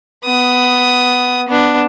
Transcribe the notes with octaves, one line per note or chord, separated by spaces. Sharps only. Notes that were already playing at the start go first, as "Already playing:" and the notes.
B3 D#6
B3 D4